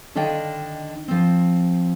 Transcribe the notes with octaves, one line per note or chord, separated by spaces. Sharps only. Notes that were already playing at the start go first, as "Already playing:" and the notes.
D3 D#3 D4 D#5 F5 G5
F3 C4